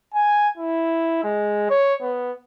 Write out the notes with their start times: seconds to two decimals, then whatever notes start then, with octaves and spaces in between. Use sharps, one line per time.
0.14 G#5
0.57 E4
1.24 G#3
1.70 C#5
2.03 B3